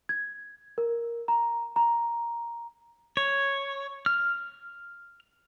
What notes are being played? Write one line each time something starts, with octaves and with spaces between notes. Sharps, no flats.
G#6
A#4
A#5
A#5
C#5
F6